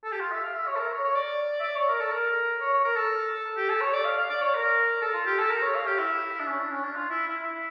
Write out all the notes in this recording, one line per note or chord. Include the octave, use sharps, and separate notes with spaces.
A4
G4
F4
E5
F5
E5
C#5
A4
A#4
C#5
C#5
D5
E5
D5
C#5
A#4
A4
A#4
C#5
C#5
A#4
A4
G4
A4
C#5
D5
F5
F5
D5
C#5
A#4
A4
F4
G4
A4
A#4
C#5
F5
G4
E4
D4
C#4
D4
C#4
D4
F4
E4
E4
E4